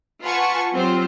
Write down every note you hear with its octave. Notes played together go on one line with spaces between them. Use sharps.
F4 B4 F#5 G#5 A5 C#6
F#3 C4 F4 G4 C5